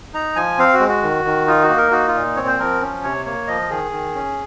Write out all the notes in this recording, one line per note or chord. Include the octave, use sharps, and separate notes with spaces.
D#4 A#5
F3 G#5
C4 F5
F#4
G#3
F#4
D#3
D#3
D#4 F4
F#4
A#3
A#4
D#4 F#4
F4
A#2
C4 C#5
C5
F3 A#4
C#4
C3 C#5
A#3 C#5
F3 D#5
D#3 G#4
D#3
C#4